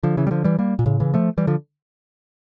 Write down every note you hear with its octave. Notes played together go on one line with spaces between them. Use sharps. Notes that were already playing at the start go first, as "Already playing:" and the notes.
D3 F3
C#3 E3
G3
D3 F3
E3 G3
G3 A#3
A#2
A2 C#3
C#3 E3
F3 A3
E3 G3
D3 F3